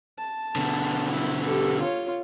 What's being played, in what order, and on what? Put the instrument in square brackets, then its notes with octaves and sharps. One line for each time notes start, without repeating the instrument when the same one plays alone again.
[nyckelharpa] A5
[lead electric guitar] B2 D3
[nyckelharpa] E4
G4 A4
F4 C#5